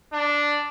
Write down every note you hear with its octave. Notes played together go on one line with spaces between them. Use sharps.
D4